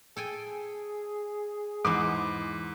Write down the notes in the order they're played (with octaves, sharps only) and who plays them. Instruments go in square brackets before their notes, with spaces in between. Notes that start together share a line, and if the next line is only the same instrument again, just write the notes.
[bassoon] G#4 [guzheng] A4 G5 G#5
[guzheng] E2 B3 C6 [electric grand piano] G#2 [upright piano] D6